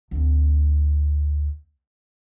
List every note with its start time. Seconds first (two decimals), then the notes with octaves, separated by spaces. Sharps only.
0.11 D2 C4